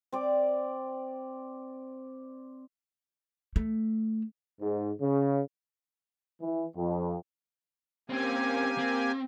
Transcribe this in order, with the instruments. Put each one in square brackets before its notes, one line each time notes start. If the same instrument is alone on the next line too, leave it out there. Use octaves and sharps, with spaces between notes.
[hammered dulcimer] C4 D5
[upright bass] A3
[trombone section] G#2
C#3
[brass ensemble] E3
F2
[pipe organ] A#3 G4 G#5 [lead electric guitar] C4 C#4
[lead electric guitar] C4